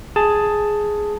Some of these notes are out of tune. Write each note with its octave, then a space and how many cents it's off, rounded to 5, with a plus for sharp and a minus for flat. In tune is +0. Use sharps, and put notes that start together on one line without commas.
G#4 +5 A5 +5